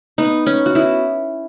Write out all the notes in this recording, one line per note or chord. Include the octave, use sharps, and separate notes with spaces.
B3 D#4
B3 C#4
F#4
B3 E4